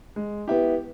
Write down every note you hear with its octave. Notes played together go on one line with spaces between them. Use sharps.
G#3
B3 E4 G4